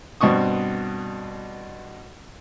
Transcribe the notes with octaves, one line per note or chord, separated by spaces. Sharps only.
G2 B2 C4 C#6 D#6